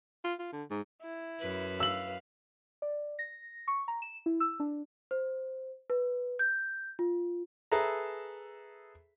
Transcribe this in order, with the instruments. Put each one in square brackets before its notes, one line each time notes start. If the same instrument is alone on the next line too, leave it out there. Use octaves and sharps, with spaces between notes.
[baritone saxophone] F4
F4
D3
G#2
[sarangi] E4
[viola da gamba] F#2 B4
[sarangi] F5 [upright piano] E6 F#7
[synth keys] D5
A#6
C#6
A#5
E7
E4
E6
D4
[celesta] C5
B4
G6
F4
[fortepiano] G#4 A4 B4 E5 A#5